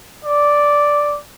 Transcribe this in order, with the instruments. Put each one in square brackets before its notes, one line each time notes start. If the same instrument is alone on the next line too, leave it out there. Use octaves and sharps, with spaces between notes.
[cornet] D5